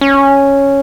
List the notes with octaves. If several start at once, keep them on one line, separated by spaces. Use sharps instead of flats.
C#4